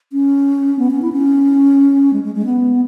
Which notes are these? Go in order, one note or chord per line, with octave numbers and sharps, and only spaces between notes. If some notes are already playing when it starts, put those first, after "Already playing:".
C#4
B3
C#4
E4
C#4
G#3
G#3
G#3
B3